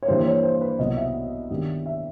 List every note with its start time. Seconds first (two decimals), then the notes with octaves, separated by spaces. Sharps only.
0.03 C#5
0.08 G2 E3 G3 A#3 C5
0.26 C#5
0.43 C5
0.61 B4
0.79 C2 B2 F#3 B3 D#5
0.97 E5
1.50 G2 D#3 G3 B3
1.86 E5